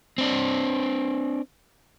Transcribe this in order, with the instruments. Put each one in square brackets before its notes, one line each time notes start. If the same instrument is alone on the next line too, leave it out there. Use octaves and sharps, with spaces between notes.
[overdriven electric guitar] C4 D4